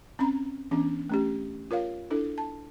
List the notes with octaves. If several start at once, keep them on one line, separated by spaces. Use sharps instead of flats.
C4 C#4 A#5 B5
E3 B3 C#4 D4
A3 C#4 G4
F4 A#4 C#5 F5
D4 E4 A4
A5